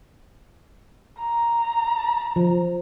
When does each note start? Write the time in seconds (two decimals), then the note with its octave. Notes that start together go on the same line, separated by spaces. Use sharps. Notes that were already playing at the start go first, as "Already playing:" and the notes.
1.18 A#5
2.36 F3